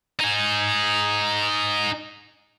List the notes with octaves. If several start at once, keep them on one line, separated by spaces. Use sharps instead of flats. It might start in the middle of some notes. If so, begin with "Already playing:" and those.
D#4 G#4